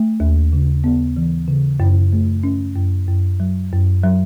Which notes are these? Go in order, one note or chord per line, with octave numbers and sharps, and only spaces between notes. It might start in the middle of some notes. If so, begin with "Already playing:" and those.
Already playing: A3
D#2
C#3
B3
E3
C#3
F#2
A3
C#4
F#2
F#2
F#3
F#2
F#3